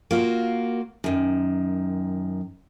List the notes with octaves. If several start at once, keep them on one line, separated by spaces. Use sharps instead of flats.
A#3 F4 F#4
F#2 D#3